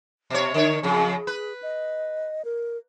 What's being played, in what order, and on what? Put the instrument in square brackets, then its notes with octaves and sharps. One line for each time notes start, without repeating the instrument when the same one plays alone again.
[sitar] B2 C#5
[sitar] D3 C#5 [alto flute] A#4
[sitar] F2 C#3 [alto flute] G#4
[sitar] B4
[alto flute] D#5
A#4